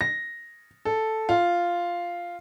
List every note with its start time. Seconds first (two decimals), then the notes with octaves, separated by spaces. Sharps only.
0.01 A#6
0.85 A4
1.29 F4